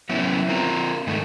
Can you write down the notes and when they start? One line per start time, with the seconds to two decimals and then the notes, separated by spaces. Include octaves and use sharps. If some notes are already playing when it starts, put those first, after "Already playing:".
0.09 F#3 B3 C#4 E4
0.49 C4 F4 A#4
1.07 G#2 D#3 A3